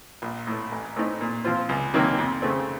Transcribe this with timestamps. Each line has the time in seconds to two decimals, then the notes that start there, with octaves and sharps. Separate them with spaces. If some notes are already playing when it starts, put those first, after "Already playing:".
0.22 A#1
0.47 A2 A3
0.72 A1
0.96 A2 A3 C4 D#4
1.21 A#2
1.45 F3 C4 F4 C5
1.69 C#2
1.94 C3 D#3 F#3 A#3
2.18 F2
2.42 C#3 A3 C4